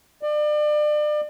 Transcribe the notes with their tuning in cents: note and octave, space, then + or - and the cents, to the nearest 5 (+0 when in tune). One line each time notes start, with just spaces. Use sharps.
D5 +35